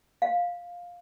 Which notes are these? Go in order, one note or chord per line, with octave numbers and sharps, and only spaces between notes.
F5